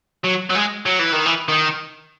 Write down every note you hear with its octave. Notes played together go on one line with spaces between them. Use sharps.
F#3
F#3
G#3
F#3
E3
D#3
E3
D#3